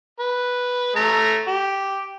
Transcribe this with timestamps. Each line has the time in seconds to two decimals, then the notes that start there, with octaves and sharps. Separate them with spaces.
0.20 B4
0.96 A3 A#5
1.47 G4